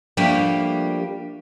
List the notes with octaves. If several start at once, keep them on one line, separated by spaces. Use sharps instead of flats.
F3 G3 A3 A#3 D4 G4